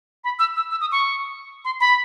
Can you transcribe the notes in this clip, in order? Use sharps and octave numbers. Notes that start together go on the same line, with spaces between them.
B5
E6
E6
E6
D#6
C#6
C6
B5